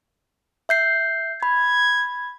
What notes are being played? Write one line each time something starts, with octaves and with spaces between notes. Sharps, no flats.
E5 G6 C7
B5 G#6